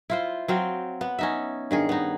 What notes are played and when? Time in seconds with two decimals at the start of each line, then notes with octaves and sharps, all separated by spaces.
0.10 E4 F4 C5
0.48 F#3 C4 F5 G5
1.01 B3
1.19 C#4 D#4 E5
1.71 G2 D#3 G#4
1.89 B3 D#4